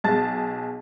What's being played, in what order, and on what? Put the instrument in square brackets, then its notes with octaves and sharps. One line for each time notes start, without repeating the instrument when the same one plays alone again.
[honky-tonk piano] B1 G#4 A5 A6